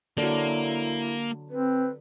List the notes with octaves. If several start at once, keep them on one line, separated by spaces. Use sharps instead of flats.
D3 F#3 A#3 E4
C4 B4